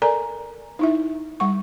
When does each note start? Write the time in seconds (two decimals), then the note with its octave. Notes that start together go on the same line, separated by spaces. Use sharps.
0.02 A4 A#4 D5 G#5 A#5
0.79 D#4 E4 E5
1.40 G3 F#5 C#6